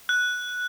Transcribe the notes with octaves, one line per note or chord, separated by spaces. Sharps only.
F#6